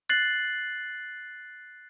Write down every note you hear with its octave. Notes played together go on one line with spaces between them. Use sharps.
F#6 A6 C7 F#7